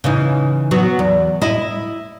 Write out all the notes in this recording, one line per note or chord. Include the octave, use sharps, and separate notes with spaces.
C#3 E3 D#4
F#3 B3
E2
E4 D#5